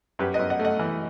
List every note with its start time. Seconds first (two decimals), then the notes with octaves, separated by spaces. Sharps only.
0.19 F#2 G4 B4
0.34 B4 D#5
0.39 F#2
0.50 D#5 F#5
0.59 A3
0.65 D#5 F#5
0.79 E3